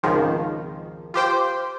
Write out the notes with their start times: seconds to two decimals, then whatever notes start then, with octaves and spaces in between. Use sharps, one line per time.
0.03 G#1 C#2 D#3 F3
1.14 F4 G4 C5 G5